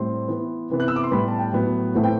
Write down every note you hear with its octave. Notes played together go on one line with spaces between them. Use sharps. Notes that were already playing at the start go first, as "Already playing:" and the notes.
Already playing: A2 G3 C4 C6
E3 B3
C3 E3 B3
F#6
E6
D6
C6
A2 G3 B3 B5
A5
G5
A2 F#3 B3
A2 E3 A3 C4 F#5
G5